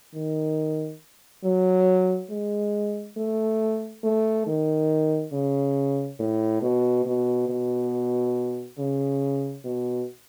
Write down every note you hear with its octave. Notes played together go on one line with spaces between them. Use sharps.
D#3
F#3
G#3
A3
A3
D#3
C#3
A2
B2
B2
B2
C#3
B2